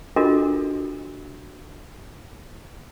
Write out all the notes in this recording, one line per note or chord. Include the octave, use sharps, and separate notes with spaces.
D4 F4 F#4 A4 A#4 D#5